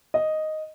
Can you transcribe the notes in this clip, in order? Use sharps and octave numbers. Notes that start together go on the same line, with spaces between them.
D#5